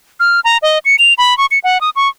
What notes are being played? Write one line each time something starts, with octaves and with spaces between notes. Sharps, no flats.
F6
A#5
D#5
C#7
F7
B5
C#6
C#7
F#5
D#6
C#6